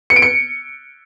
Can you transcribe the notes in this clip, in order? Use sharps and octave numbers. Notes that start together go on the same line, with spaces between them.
C#7
D7
C#7